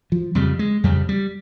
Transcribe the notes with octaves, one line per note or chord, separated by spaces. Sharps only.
F3
F2 C#3 G3
G#3
F2 C#3 G3
G3